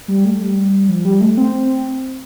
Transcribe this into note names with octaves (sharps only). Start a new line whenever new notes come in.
G3
A3
G3
F3
G3
A3
C4